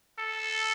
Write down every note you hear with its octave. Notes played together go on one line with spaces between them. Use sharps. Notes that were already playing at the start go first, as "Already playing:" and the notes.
A4